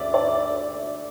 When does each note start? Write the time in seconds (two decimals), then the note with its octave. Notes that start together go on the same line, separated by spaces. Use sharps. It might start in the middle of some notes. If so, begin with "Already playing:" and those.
Already playing: D2 C#3 D5 E5
0.14 D5